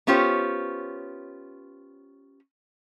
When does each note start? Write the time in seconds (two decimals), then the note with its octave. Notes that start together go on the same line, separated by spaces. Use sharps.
0.07 B3 C#4 F4 G4 C5 C#5